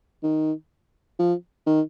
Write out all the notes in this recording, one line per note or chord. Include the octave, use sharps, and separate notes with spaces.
D#3
F3
D#3